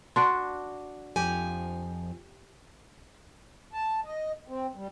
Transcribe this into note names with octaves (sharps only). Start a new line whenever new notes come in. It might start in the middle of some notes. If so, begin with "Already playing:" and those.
D4 F#4 D5 C6
F2 F3 G4 G#5
A5
D#5
C4
G3